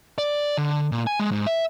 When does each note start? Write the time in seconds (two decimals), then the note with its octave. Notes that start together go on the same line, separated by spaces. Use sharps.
0.18 D5
0.58 D3
0.92 A#2
1.07 G#5
1.20 G#3
1.31 G#2
1.47 E5